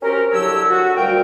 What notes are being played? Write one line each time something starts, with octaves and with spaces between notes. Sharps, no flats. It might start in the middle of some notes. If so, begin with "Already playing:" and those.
C4 C#4 F#4 G4 A#4
C2 D3 F#3 G4 C#5 E6
F#4
D2 A#2 G3 A#4 G5